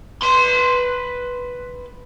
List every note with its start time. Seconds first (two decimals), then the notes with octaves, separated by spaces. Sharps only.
0.22 B4 C6